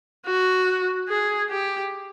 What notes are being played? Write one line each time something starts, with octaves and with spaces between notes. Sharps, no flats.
F#4
G#4
G4